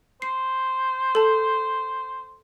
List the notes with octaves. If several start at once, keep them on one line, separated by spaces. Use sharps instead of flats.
C5 C7
A4 A5